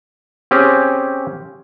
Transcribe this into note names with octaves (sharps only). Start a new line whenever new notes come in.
C4 C#4 G4 G#4